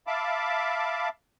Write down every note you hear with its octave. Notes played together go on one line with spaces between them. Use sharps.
E5 F5 A5 B5 D6